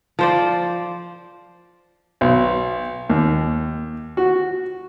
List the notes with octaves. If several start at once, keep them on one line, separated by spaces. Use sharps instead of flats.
F3 C5 D5
B1
D#2
F#4